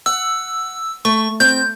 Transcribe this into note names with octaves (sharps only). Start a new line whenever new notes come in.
F#5 E6
A3 C#6
C4 G6